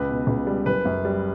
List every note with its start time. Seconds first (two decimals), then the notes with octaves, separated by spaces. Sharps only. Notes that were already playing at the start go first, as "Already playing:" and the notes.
Already playing: C#2 B4
0.09 B2
0.27 C#2
0.47 G3
0.66 F#1 B4
0.85 F#2
1.05 G3